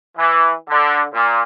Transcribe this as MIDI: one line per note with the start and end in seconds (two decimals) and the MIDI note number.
0.18 0.51 52
0.69 1.02 50
1.13 1.42 46